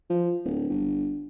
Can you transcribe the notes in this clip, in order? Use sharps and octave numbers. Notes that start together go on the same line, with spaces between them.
F3
D1
G1